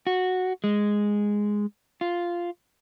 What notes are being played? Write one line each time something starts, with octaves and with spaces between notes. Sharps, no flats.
F#4
G#3
F4